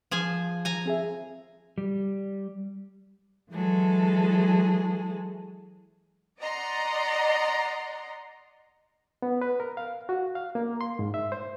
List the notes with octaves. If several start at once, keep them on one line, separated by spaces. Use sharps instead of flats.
F3 G#4 G#5
G#5 A#5
C4 G#4 E5
G3
E3 F#3 G#3 G#4 A4
D5 D#5 F#5 A#5 C6
B3
B4
A#4
F5
F#4
F5
A#3
C6
G#2
E5
C5